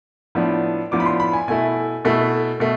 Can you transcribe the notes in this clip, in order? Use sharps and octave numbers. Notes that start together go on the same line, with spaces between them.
A2 F3 B3 D4
A2 F3 B3 D4 D6
B5
C6
B5
G#5
B2 A3 E4 G#5
B2 A3 E4
B2 A3